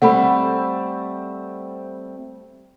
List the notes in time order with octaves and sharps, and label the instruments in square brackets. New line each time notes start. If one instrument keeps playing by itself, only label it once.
[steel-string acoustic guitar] G3 A3 C4 [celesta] F#5 B5